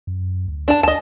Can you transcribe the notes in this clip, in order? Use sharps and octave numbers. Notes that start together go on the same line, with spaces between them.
F#2
D2
D4 A5
D2 D#5 A5